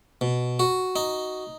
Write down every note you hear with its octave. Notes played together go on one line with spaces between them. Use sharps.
B2
F#4
D#4